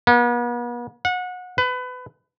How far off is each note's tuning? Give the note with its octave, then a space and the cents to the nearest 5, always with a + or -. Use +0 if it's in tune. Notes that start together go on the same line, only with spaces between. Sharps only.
B3 -40
F#5 -30
B4 +25